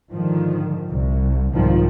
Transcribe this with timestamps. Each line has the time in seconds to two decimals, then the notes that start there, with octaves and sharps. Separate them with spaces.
0.13 G#2 D3 D#3 F3
0.88 C2
1.53 C2 G#2 D#3 F3